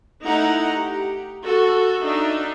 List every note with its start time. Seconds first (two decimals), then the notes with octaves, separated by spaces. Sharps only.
0.24 A3 D#4 E4 F#5 A#5
0.74 G4
1.46 F#4 A4
2.04 D4 D#4 E5